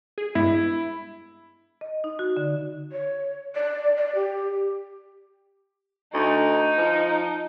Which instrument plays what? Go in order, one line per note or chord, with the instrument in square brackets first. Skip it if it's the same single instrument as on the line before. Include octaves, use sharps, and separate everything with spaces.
[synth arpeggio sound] G#4
[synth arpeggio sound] G2 G#3 B3 [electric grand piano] E4
[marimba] D#5
D#4
F#4
D3
[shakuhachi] C#5
D5
D5
G4
[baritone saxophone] D2 [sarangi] D#4
[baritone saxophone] F3